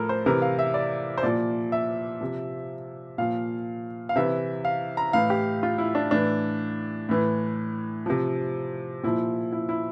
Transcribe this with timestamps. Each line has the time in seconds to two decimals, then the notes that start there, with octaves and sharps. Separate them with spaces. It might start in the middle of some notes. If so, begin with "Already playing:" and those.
Already playing: A2 F3 A4 A#4
0.09 C5
0.26 C3 E3 A#4
0.42 F5
0.59 E5
0.74 D5
1.18 C5
1.23 A#2 F3 D5
1.72 E5
2.21 C3 F3
3.18 A#2 F3 F5
4.09 F5
4.16 C3 E3 E5
4.65 F5
4.97 A#5
5.13 A2 E3 F5
5.30 G4
5.63 F4
5.78 E4
5.95 D4
6.11 A2 E3 D4
7.09 A2 E3
8.06 C3 F3
9.03 A#2 F3 E4
9.52 E4
9.69 E4